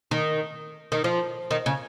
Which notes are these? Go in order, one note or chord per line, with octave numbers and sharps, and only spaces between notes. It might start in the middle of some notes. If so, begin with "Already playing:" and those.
D#3
D#3
F3
D#3
C#3